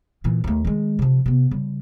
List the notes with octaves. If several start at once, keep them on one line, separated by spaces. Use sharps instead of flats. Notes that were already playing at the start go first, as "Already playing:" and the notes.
A#2 E3
D#2 A3
D#3 G#3
C3 F3
C3 B3
C#3 G3